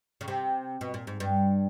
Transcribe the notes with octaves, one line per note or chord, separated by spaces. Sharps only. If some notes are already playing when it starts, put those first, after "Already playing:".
C#3
C3
B2
A#2
G#2
G2